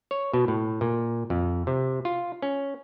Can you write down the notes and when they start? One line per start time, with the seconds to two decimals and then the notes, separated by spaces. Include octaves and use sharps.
0.11 C#5
0.33 B2
0.48 A2
0.81 A#2
1.30 F2
1.67 C3
2.05 F4
2.42 C#4